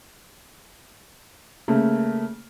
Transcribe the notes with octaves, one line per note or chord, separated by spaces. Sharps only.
C#3 A3 A#3